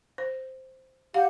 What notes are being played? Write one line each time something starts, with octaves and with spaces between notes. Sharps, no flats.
C5
G4 F5 F#5